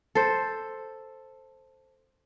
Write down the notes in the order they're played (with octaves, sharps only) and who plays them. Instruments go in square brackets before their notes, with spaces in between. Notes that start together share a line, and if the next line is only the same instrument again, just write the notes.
[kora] A4 C5